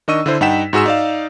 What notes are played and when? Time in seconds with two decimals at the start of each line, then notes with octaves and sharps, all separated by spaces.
0.08 D#3 D4 D#5 C#6 E6 D#7
0.26 D3 E4 C5
0.41 G2 D#4 F#5 G5 B6 E7
0.73 G#2 F#4 G#4 E6 E7
0.86 D#4 D5 F5